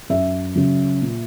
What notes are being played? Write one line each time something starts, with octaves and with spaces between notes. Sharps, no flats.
F#2 E5
C#3 F#3
A#2